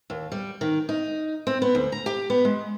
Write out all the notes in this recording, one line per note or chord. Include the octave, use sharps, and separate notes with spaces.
D#2
G3
D#3
D#4
C4
B3
D2
A#5
G4
B3
G#3